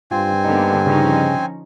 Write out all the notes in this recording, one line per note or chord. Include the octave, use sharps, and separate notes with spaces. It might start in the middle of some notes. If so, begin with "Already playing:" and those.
G2 C4 F4 G#5
D3 A#3 B3 D#4
C#3 F3 C#4 D#4